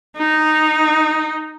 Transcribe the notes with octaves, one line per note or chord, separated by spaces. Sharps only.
D#4